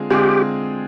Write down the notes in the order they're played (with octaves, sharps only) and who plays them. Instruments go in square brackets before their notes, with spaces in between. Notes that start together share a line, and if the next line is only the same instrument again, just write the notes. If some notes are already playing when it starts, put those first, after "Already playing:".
Already playing: [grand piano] D3 G#3 C4 F4 G#4
[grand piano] D3 G#3 C4 F4 G#4 [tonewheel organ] G4